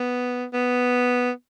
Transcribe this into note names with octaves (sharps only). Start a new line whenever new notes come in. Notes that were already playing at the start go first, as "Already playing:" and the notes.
Already playing: B3
B3